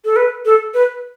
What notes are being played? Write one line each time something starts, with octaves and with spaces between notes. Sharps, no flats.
A4
B4
A4
B4